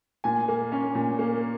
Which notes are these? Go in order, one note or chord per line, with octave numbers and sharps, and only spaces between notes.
A#2 G#5
A#3
C#4
A#2
A#3